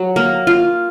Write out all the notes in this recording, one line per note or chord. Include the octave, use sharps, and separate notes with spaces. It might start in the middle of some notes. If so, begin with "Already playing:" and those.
Already playing: F#3
A#3
F4